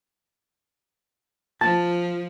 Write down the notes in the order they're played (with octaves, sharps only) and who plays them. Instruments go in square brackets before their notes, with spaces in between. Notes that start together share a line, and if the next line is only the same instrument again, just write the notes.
[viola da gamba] F3 [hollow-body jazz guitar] A5